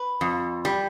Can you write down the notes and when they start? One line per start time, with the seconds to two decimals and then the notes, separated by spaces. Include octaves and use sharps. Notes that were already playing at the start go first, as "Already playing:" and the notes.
Already playing: B4
0.21 F2
0.65 G3